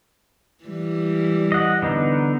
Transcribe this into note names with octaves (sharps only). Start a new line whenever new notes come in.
E3 G3
D#5 F#5
D3 B3 D#4